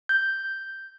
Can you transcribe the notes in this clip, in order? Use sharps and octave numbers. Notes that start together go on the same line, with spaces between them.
G6